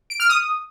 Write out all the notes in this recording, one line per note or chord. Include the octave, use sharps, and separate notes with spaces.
D7
F6
D#6